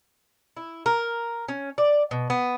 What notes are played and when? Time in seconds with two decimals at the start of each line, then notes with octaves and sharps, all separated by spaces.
0.57 E4
0.86 A#4
1.49 C#4
1.78 D5
2.11 B2
2.30 B3